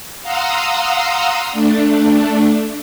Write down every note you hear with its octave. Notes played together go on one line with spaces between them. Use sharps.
F5 F#5 A#5 C6 D#6 E6
A3 D4